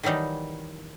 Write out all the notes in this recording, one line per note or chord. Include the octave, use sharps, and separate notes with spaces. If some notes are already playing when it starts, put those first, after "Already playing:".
D#3 E3 F#3 G3 D#4